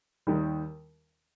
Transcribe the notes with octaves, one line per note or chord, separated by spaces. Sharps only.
D#2 D#3 G3